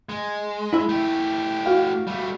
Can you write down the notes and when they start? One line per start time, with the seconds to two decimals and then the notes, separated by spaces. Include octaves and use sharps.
0.09 G#3
0.73 E4 E5
0.89 A3 G4
1.66 F#4 F5
2.07 G3 A3